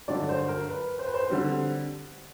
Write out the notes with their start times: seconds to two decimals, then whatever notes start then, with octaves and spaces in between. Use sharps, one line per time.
0.08 G2 D3 F#3 D5
0.29 C5
0.48 A#4
0.69 B4
0.99 C5
1.06 B4
1.14 C5
1.30 D3 G3 C4